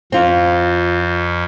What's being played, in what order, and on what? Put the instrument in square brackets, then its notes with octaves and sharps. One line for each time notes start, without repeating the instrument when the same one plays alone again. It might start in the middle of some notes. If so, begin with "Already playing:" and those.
[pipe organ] F2 [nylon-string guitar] C4 F4